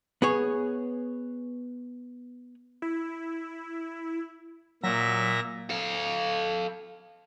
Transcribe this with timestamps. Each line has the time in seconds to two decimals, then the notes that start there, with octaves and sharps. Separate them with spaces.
0.22 B3 G#4 C#5
2.82 E4
4.83 A#2 F#3 E5 A#6
5.70 A4 F5